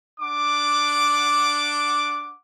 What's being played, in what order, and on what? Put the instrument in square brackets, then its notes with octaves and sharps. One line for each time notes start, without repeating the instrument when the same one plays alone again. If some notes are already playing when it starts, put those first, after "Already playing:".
[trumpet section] D4 F#5 D6